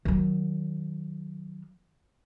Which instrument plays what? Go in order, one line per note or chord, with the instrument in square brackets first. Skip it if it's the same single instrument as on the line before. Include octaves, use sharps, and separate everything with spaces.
[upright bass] D#3 F#3